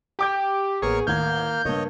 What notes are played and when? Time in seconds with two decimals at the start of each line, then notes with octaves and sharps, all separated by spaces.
0.19 G4 G5 D6 G6
0.82 A1 A#3 B3 G#4 A#4 C#5 C#6
1.07 A1 D2 D#3 A#3 F6 G6 G#6
1.65 G2 C#3 A#3 C#5 D#5